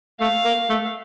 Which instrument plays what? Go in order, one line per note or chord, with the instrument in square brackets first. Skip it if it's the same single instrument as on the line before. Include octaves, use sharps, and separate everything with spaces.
[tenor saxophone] A3 [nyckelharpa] F5
[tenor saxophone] A#3
A3